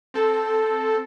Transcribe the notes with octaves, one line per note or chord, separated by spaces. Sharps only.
C4 A4